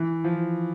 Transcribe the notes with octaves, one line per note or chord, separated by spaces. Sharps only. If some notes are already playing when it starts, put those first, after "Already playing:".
Already playing: E3
F3